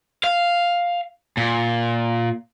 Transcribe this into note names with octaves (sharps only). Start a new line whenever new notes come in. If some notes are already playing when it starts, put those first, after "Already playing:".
F5
A#2